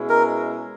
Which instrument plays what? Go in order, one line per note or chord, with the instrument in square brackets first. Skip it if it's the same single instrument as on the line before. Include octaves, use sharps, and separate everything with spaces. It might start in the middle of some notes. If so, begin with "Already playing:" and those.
Already playing: [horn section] B2 G#3 C#4 E4
[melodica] A#4